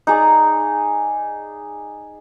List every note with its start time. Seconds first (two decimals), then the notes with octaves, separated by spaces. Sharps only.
0.07 D#4 G#4 D5